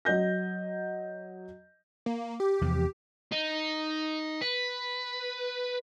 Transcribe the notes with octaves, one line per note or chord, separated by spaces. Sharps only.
F#3 D#5 G6 A#6
A#3
G4
E2 C3 F3
D#4
B4